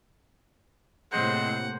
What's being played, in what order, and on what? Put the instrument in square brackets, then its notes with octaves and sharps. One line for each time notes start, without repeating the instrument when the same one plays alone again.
[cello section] A2 C3 A#3 [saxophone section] G#3 C4 [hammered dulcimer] C5 [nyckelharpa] F#5